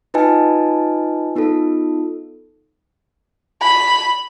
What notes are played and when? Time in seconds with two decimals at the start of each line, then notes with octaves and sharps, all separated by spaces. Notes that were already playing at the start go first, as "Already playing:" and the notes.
0.14 D#4 F4 B4 D#5 G#5 A5
1.36 B3 D#4 F4 A4
3.62 B5